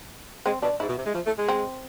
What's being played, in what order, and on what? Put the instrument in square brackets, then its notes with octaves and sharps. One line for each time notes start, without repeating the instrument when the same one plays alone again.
[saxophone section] G#3 [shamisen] C4
[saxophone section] B2 [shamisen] D4
[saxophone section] G#2 [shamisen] E4
[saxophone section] B2
C3
G#3
F3
A3
G#3
[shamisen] C4